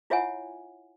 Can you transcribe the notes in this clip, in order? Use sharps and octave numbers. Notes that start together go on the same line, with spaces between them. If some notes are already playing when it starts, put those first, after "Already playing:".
E4 F4 C#5 E5 F#5 G#5